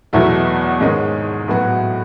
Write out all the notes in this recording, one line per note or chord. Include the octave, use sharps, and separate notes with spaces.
E2 B2 F#3 A3 E4
G#2 D#3 G#3 C#4
A2 F#3 B3 F#4